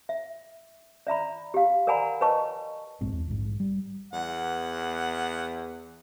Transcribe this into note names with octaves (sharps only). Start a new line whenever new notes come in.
E5
D5 E5 A#5 B5
G4 F5
A#4 D5 F#5 G#5 A#5 B5
B4 C#5 D#5 A5 C#6
F1 A#1 G#2 C4
E2
A#1 G#2
G3
E2 F#5